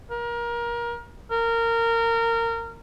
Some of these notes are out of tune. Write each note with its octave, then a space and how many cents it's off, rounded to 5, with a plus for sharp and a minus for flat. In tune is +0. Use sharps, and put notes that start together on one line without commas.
A#4 +25
A#4 -20